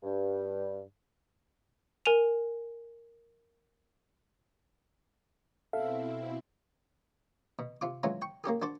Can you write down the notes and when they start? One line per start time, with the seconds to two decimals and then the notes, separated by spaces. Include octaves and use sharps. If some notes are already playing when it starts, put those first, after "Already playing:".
0.03 G2
2.05 A#4 G#5 D#7 F7
5.73 B2 C4 E4 A4 E5 F5
7.59 B2
7.81 C3 F4 D6
8.03 E3 F#3 G#3 C#4 F4
8.22 G5 C#6
8.44 A#3 C#4 G4 G#4
8.62 D4 F#4 C5 D5